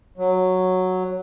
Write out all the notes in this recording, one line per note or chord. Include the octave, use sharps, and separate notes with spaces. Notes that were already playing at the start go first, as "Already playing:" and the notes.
F#3